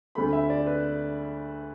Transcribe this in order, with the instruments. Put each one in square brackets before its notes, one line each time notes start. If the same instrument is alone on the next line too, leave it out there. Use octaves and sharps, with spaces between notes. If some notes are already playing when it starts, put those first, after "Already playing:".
[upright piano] D2 D3 A3 B5
E5
D5
B4